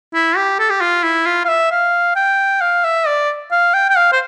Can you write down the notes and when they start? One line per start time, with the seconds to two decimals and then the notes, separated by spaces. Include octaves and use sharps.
0.14 E4
0.37 G4
0.59 A4
0.70 G4
0.81 F4
1.03 E4
1.26 F4
1.45 F5
1.49 E5
1.71 F5
2.16 G5
2.61 F5
2.84 E5
3.07 D5
3.52 F5
3.74 G5
3.90 G5
3.97 F5
4.12 C5